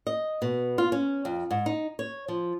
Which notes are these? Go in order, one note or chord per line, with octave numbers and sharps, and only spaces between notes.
D#5
B2
F4
C#4
F2
G#2
D#4
C#5
F3